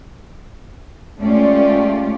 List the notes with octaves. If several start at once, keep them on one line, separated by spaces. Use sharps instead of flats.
G#3 A3 C#4 F4 G4 D5